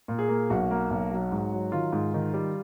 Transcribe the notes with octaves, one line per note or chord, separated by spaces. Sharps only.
A#2
G#4
A#3
B1 F#4
A#3
B1
F#3
G#2
F#3
D#3 F4
G#2
D#3
G3